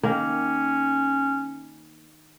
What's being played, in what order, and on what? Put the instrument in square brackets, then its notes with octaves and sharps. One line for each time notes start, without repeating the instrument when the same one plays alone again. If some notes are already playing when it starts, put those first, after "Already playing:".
[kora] D#3 A#3 [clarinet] C#4